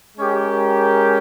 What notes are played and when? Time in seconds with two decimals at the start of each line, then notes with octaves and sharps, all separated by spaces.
0.17 G#3 C#4 G4 A#4